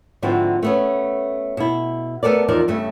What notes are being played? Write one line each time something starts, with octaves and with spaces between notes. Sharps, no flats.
G#2 D3 F3 C4 E4 F#4
A3 B3 C#4
B2 E4
A3 B3 A4 A#4 D5
E2 F3 D#4 A#4 D5
G2 C#3 A3